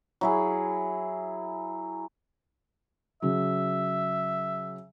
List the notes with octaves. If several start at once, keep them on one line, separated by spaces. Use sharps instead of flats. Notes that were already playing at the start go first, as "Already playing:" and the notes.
F#3 E4 G#4
C#3 F#3 E5